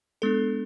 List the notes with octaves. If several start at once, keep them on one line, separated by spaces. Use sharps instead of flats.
G#3 B3 D4 A4